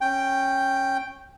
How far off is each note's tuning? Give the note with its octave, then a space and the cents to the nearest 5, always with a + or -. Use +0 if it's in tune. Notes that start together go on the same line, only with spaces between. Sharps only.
C#4 -20 G5 +0